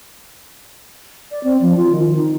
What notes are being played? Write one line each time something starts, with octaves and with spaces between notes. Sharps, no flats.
D5
C4
F3
F4
D#3
D#4